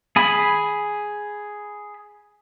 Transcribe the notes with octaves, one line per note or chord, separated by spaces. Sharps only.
G#4 G#5 B5